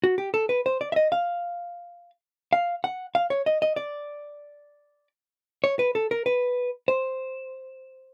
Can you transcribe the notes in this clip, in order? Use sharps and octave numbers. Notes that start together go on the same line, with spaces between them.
F#4
G4
A4
B4
C5
D5
E5
D#5
F5
F5
F#5
F5
C#5
D#5
D#5
D5
C#5
B4
A4
A#4
B4
C5